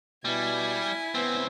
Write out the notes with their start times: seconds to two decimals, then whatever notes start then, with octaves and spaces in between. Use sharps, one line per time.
0.25 B2 G3 E4 G#5
1.15 C#2 B3 C4